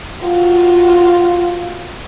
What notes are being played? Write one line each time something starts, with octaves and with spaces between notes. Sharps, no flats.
F4 F#4